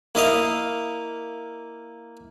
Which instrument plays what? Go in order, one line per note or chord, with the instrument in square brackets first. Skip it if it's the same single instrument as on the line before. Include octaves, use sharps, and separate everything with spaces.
[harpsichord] A#3 E4 D#5 F5